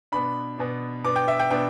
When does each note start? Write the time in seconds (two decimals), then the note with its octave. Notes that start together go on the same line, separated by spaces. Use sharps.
0.12 B2 B3 D4 B5
0.58 B2 B3 D4
1.04 B2 B3 D4 D6
1.16 G5
1.28 E5
1.39 G5
1.50 B2 B3 D4 G5